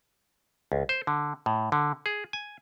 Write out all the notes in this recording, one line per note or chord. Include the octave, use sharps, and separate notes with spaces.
C#2
C5
D3
A2
D3
G#4
G#5